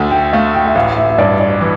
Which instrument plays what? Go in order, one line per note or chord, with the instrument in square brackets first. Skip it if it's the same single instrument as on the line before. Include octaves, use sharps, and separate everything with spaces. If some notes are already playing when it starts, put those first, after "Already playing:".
Already playing: [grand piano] D2 D3 A3
[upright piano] G5
[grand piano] A3 [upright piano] F5
[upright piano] G5
E5
[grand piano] A1 [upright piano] F5
[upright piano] E5
E5
[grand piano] G2 [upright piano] D5
[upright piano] D5
[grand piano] E3